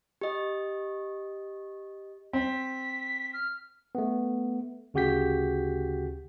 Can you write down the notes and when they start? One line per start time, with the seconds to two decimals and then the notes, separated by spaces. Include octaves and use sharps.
0.21 G4 D#5
2.33 C4 B6
3.33 F6
3.95 A3 B3
4.94 D2 C#3 F#4 G4 G6 B6